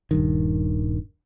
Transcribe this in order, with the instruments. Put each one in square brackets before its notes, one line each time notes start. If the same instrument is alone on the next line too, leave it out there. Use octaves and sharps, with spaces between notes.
[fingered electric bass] D#1 G2 D#3